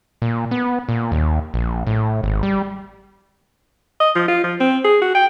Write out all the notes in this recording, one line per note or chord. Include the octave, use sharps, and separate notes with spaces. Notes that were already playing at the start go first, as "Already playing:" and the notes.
A#2
B3
A#2
D#2
A#1
A2
G#1
G3
D#5
F3
F4
F3
C4
G#4
F#4
G5